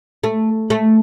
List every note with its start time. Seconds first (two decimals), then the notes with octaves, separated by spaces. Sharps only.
0.24 A3
0.70 A3